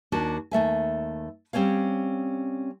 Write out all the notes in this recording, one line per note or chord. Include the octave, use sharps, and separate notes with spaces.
D#2 D4 F#4
D#2 A3 E5 G#5
G3 C4 C#4 C#5 F5